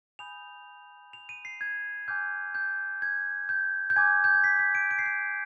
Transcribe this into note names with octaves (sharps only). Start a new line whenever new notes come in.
G#5 B5 D#6 G6 F7
F7
D#7
C7
G#6
G#5 D6 F6 G6
G6
G#6
G6
G6
G#5 D6 F6 G#6
G6
G#6
B6
B6
D7
D7
C7
D7